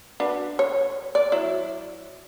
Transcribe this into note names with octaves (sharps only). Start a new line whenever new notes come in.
D4 F#4 B4
C#5
D5
F#3 E4